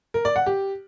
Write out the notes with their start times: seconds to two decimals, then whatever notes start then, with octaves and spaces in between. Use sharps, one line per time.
0.14 A#4
0.25 D5
0.36 F#5
0.46 G4